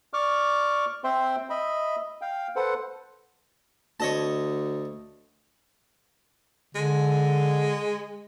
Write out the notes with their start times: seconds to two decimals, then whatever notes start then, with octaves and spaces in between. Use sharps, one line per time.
0.13 D5 C#6 D6 F6
1.04 C4 C5 E5 G5 C6
1.50 D#5 E5 B5
2.21 F5 G5
2.56 A4 B4 C5 F#5
4.00 D2 C#5 D#5 A5
6.75 D3 G#3